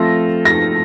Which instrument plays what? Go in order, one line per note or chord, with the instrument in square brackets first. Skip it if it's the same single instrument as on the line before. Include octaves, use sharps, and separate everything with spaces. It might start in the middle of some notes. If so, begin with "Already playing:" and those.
Already playing: [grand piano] F3 A3 C4 F4 A4 [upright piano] A#6
[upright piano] A#6